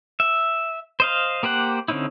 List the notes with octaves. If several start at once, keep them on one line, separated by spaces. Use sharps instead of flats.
E5
C5 D#5 F5
A#3 G4 C5 F#5
D3 C4 C#4 D#4 E4